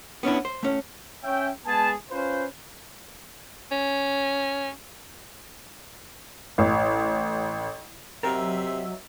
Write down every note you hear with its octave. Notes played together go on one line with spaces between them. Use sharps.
B3 C#4 D4 E4
C5
A3 C#4
C#4 E5 G5
G#3 B3 G#4 G#5 A5
C#4 F4 B4 C5
C#4
A1
C3 F#3 F#4 A#4 D#5 E5